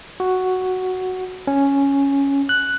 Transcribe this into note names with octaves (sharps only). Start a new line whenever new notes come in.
F#4
C#4
F#6